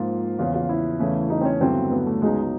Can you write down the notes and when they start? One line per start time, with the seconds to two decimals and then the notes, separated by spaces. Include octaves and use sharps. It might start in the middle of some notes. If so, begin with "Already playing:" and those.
Already playing: G#2 F3 A#3 F4
0.39 E2 C#3 F3 F4
0.54 F4
0.69 E4
1.00 E2 C#3 E3 A3 C#4
1.30 D#4
1.41 C4
1.45 C#4
1.61 G2 D3 F#3 B3 C4 E4
1.91 B3
2.06 A3
2.21 C#2 C#3 F#3 G#3 B3 D#4